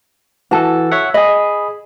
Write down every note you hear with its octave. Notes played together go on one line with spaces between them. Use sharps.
E3 F#4 A4 A5
C#5 E5 F#5
G#4 D#5 B5